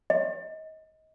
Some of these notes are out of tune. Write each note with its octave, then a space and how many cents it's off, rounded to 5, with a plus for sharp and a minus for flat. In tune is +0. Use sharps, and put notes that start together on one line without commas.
D#5 +25